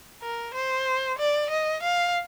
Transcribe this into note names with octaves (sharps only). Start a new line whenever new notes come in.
A#4
C5
D5
D#5
F5